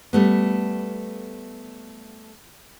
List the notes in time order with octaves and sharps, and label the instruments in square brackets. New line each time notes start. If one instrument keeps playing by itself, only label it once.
[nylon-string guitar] G3 A3 B3